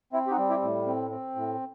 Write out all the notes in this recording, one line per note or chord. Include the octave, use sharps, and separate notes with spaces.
C4 E4
G4
D#4 F#4
G3
E4 G4
A2
C4
C4
A2